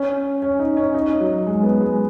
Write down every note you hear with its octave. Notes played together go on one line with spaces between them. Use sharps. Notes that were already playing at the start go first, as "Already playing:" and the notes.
Already playing: C#4
C#4
D#4
C#4
D#4
F#3
G#3
B3
G#3